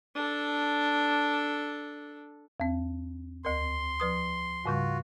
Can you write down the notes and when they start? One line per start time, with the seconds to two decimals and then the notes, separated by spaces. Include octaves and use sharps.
0.15 D4 A4
2.60 E2 C4
3.45 D2 A#4 C6
4.00 F3 B4 D#6
4.66 G#2 C#3 G3 F4 F#4